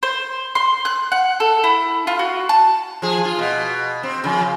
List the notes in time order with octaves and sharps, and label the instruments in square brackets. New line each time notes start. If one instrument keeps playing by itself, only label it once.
[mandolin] C5
C6
F#6
F#5
A4
E4
F4
F#4
A5
[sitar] F3 G#4
F4
B2
C4
F2 C#3